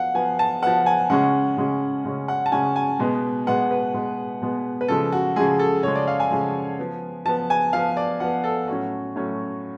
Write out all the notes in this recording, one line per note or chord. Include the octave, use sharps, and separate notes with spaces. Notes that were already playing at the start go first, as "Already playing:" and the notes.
Already playing: F3 B3 F5 F#5
F3 B3 G#5
A5
F3 B3 F#5
G#5
C#3 G#3 C#4 F#5
C#3 G#3 C#4
C#3 G#3 C#4
F#5
A5
C#3 G#3 C#4 G#5
G#5
B2 G#3 B3
B2 G#3 B3 F#5
B4
B2 G#3 B3
B2 G#3 B3
B4
C#3 F3 G#3 A4
F#4
C#3 F3 G#3 G#4
A4
C#3 F3 G#3 C#5
D5
F5
G#5
C#3 F3 G#3
F3 B3
F3 B3 A5
G#5
F3 B3 F5
D5
F3 B3 F#5
A4
A2 F#3 C#4 F#4
A2 F#3 C#4